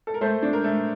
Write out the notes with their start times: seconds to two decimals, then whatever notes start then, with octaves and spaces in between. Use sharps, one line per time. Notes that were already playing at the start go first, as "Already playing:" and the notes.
0.07 A4
0.14 A#4
0.21 A3 A4 C5
0.42 D4
0.53 A#4
0.64 A3